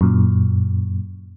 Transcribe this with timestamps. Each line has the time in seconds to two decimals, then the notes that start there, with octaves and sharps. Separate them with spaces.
0.01 F#2 A#2